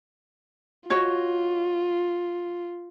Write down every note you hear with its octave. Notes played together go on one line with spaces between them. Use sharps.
F4 F#4 C#5 D#5